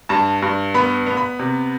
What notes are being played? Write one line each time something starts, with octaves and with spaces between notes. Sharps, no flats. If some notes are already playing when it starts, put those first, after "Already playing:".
G2 A5
G2
B3 B5
B3
B5
C3